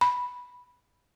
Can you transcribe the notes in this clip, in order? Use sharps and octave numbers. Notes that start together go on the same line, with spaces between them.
B5